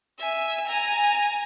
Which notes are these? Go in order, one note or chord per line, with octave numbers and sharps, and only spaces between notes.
E5 G#5
G#5 A#5